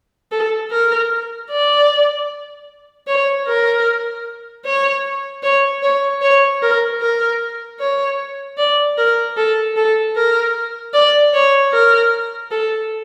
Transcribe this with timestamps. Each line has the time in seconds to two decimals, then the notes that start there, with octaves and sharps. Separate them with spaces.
0.32 A4
0.71 A#4
1.50 D5
3.07 C#5
3.47 A#4
4.65 C#5
5.43 C#5
5.83 C#5
6.22 C#5
6.62 A#4
7.01 A#4
7.80 C#5
8.58 D5
8.98 A#4
9.37 A4
9.76 A4
10.16 A#4
10.93 D5
11.34 C#5
11.73 A#4
12.51 A4